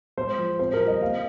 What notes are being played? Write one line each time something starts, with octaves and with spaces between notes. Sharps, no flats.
G#3 C5
F3
C4 C5
A#4
G3
D#5
A#3 F5